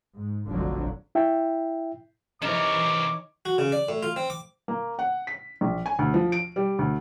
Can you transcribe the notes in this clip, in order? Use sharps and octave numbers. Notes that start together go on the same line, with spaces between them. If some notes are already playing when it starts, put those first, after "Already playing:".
G#2
F1 A#1 D3 F3 F#3
E4 E5 G5
C3 E3 D#4 A#4 C#5 D6
F#4
C#3
D5
A2
F4
C4
D6
A#3
F#5
B6
A#1
G#5
D2
F3
D7
G3
D2